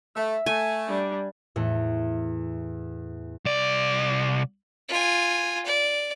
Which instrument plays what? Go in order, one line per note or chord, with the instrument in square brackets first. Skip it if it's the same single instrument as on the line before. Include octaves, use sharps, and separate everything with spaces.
[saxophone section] A3 [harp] E5 E6
[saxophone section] A3 [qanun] G#5
[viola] G3 D4
[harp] E2 A2 A3
[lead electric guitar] C2 D5
[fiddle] F4 G#5
D5